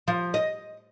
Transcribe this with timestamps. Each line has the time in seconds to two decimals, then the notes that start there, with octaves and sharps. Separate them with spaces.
0.08 F3
0.34 D#5